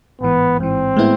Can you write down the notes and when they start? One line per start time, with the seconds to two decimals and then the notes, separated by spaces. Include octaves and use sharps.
0.21 A1 G#2 E3 B3
0.58 A1 G#2 E3 C4
0.97 A2 G#3 B3 E4